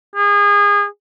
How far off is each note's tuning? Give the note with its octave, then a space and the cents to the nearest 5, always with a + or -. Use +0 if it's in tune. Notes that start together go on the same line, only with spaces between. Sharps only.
G#4 -30